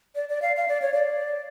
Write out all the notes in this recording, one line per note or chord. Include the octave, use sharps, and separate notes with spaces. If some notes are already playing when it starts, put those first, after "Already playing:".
D5
D5
F5
F5
D5
C#5
D5